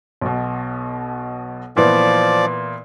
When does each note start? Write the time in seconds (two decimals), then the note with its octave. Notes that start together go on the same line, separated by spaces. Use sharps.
0.21 B1 B2
1.77 A#2 E3 F3 B3 D5